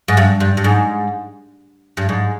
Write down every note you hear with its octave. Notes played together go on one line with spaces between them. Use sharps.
G#2
G2
G2
G2
G#2
G2
G#2